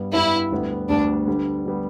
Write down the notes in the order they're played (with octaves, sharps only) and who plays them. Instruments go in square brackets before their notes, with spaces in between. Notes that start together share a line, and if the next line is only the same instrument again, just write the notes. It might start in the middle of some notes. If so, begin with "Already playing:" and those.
Already playing: [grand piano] G2 G3 B3
[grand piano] G2 G3 B3 [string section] E4
[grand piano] D2 D3 G3 B3
[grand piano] D2 D3 G3 B3 [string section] D4
[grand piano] D3 G3 B3
D3 G3 B3